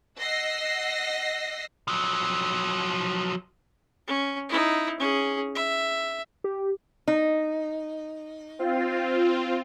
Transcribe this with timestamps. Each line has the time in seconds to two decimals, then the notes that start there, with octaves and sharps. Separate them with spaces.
0.18 D#5 F#5 E6 A#6 C7
1.88 F3 F#3
4.07 C#4
4.49 D#4 E4
4.99 C#4 G#4
5.55 E5
6.44 G4
7.08 D#4
8.59 C4 F4